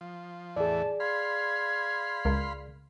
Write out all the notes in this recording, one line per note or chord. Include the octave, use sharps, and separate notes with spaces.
F3
E2 A2 E3 G#4 D5 A5
F5 B5 C6 G#6
C#2 A#4